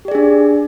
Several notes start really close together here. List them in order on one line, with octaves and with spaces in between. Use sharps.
G4 D5 G#4 D4